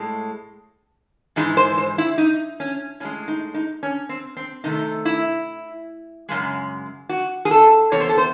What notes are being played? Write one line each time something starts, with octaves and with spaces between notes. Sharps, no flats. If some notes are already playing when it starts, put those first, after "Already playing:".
Already playing: A2 G#3
G#2 E3 G#3 D#4
C5
C5
E4
D#4
C#4
A2 G#3 C#4
D#4
D#4
C#4
C4
C4
C3 D#3 A3 D#4
E4
F#2 C#3 G#3
F#4
G#4
A4
E2 C3 C#5
C5
A4
C5